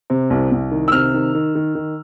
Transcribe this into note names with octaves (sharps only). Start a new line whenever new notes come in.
C3
C2
C2
D#3
E6
C3 F6
D#3
D#3
D#3
D#3